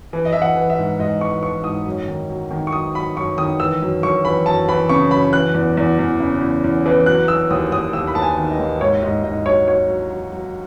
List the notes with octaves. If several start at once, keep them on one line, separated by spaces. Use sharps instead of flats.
E3
D#5
E3 E5
F#5
E3
E5
G#2
G#2 D#5
E3 C#6
E3 C#6
G#2 D#6
F#2
D#3
F#3
D#3
C#6
F#3 D#6
F#3 B5
F#2 C#6
D#3 D#6
E3 E6
F#2
F#2 C#6
E3 B5
F#2 A5
E3 B5
C#3 C#6
F#2 B5
E3 F#6
E2
E2
E2
C#3
E2
E2
E3
F#3 F#6
F#3 E6
D#2 D#6
D#2 D#6
D#2 E6
B5
D#2 A5
G#5
D#3
D#5
D#2
G#2 C#5
G#2 D#5
G#2 D#5
F#3 C#5
F#3 C#5
F#3
F#3
F#3